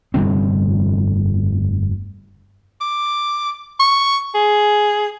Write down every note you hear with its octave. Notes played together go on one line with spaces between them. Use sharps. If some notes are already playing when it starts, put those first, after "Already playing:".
F1 G2 D3 C4
D6
C#6
G#4